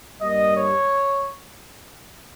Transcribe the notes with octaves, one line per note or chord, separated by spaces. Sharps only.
G2 G3 A#3 D#5
C#5